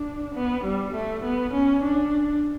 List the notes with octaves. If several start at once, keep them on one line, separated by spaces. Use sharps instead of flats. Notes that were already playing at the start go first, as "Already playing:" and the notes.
Already playing: D4
B3
G3
A3
B3
C#4
D4